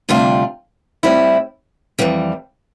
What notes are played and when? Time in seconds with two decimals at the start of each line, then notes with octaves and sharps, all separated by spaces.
0.09 D2 C3 G3 D4 F4
1.03 A2 G3 C4 E4
1.99 F2 E3 G3